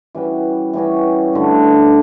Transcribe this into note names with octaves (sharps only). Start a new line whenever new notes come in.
E3 G3 C#4 F#4
E3 G3 C#4 F#4
G2 D3 A3